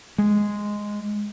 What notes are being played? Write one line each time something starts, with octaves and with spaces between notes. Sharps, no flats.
G#3